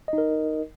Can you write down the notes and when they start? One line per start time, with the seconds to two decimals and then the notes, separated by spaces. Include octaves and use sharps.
0.08 D#5
0.13 D#4
0.18 A#4